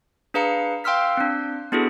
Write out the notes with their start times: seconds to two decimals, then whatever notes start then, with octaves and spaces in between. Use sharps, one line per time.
0.34 D4 G#4 B4 F5 A#5 C#7
0.84 F5 G5 C6 E6 F6 B6
1.17 C4 D4
1.72 B3 D4 E4 F#4 G#4 A4